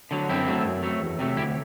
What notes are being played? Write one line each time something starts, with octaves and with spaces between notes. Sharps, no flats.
D3 F#3
F#2 C4 E4
F#3 A3
F#2
F#3 A3
E2
C3 F#3 A3
D2 E4 G4